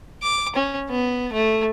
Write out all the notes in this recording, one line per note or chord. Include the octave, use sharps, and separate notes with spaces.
D6
C#4
B3
A3